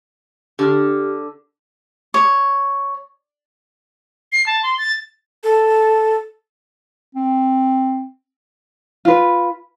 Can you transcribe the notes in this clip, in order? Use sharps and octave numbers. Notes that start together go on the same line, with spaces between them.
D3 G4 F6
C#5
C7
A5
C6
A6
A4
C4
F4 B4